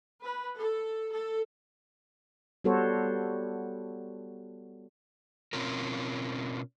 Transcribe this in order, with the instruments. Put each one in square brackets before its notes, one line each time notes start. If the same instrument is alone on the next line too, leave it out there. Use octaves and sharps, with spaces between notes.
[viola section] B4
A4
A4
[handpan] G3 B3 F#4 A4 C5 C#5
[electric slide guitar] B2 C4 C#4 F4 A#4